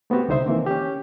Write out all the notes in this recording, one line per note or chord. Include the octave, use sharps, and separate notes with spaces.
A3 B3 C4 F#4 G4
C2 D3 D#4 C5 E5
D#3 E3 A#3 C4
C#4 G4